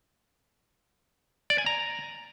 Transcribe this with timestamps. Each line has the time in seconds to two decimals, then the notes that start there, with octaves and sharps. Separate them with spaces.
1.50 D5
1.58 G#5
1.66 A#5